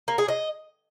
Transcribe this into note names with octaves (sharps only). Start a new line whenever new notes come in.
A#3
G#4
D#5